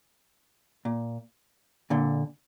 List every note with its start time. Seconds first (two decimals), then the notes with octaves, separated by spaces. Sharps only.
0.85 A#2
1.90 A#2 D3